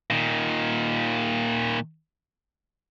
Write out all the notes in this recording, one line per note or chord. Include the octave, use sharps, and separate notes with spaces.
A#2 D#3